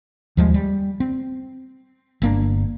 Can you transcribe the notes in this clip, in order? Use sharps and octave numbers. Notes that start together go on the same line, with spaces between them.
D#2 F3 G3 G#3
G3
C4
G1 A#3 D4